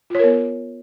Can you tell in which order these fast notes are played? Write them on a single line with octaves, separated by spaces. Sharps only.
F4 C#5 A#4 B3